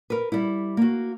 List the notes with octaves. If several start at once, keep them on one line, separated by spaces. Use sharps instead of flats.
A#4 B4
G3 E4
A#3 F#4